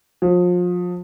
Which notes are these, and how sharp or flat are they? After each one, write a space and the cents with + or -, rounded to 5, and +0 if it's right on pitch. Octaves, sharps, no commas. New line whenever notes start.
F3 +35